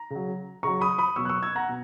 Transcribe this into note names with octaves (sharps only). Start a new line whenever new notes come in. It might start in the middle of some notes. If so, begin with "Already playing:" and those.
Already playing: A#5
C#3 F#3
C#3 F#3 A#5 C#6
B5 D#6
B5 D#6
B2 F#3 C#6 E6
F#6
C#6 E6
E6 G#6
F#5 A#5
B2